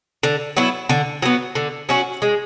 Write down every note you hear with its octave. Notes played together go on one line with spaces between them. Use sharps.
D3
F#3 B3 E4
D3
F#3 B3
D3
F#3 C#4 F#4
G#3